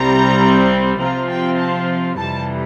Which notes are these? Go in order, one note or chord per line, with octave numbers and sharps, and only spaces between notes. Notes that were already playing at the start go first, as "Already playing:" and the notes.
Already playing: C2 C3 G3 C4 A#5
C3 F3 C4 F4 A#5
G5
A5
F2 C3 E3 G3 A5